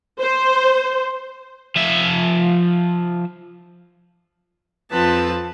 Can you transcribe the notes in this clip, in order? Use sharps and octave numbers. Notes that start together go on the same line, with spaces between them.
C5
F3 E5
F2 F3 C4 B4 A5